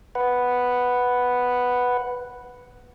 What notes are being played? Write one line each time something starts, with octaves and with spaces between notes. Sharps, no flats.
B4 F#5